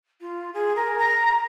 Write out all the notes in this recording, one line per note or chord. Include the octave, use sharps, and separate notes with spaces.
F4
G#4
A#4
A#5